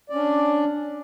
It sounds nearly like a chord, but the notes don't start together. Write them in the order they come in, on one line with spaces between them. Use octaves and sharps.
D5 C#4 D4